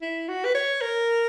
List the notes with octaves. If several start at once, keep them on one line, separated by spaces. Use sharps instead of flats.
E4
F#4
B4
C#5
A#4